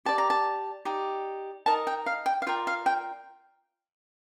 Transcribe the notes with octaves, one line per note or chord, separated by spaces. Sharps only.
G4 D5 A5
A#5
A5
D#4 G4 D5
D#4 A#4 D#5 A5
G5
F5
G5
F5
F4 A#4 D5 G5
F5
G5